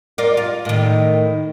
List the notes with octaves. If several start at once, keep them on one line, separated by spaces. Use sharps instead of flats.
F4 A#4 D5
F4
A2 D#3